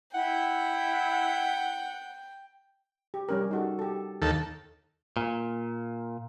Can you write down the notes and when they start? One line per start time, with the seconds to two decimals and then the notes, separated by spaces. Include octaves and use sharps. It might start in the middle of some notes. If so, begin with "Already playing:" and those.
0.14 E4 F#5 G5
3.14 G4
3.29 G3 C#4 A#4
3.51 D#4 F#4 A4
3.79 G4 A4
4.22 D#2 A4
5.17 A#2